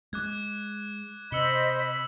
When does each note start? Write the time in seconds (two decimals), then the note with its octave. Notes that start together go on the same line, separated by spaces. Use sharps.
0.13 G#3 D6 F#6 G#6
1.32 C3 C5 D#5 B5 E6 C#7 G7